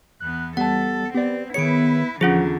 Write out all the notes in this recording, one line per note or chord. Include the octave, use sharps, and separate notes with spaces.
E2 B3 F#6
G3 B3 A4 F#5 A5
B3 C4 G4 D5
D#3 E4 G#4 B4 C#5 C#7 D7
E2 D3 F3 C#4 F4 G#4 F#5